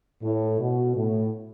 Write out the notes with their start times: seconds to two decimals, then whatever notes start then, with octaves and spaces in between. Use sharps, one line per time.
0.23 A2
0.60 B2
0.96 A2